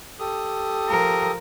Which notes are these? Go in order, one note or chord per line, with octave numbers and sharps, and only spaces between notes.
G4 A4 D#6
F3 A#4